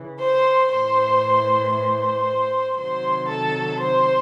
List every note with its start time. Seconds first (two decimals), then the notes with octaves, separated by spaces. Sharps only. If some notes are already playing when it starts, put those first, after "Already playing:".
Already playing: C#3 E3
0.20 C5 C6
0.72 A2 E3 C5 C6
1.74 C5 C6
2.78 C3 D#3 F#3 C5 C6
3.29 A4 A5
3.80 C5 C6